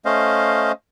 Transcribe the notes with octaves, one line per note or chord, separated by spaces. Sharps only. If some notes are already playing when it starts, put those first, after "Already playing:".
A3 C#4 C5 D#5 F5